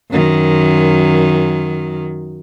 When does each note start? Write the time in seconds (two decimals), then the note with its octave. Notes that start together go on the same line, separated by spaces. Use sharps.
0.11 F#2 D#3